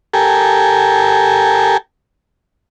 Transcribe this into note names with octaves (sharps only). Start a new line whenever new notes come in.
G4 A4 A#4 G#5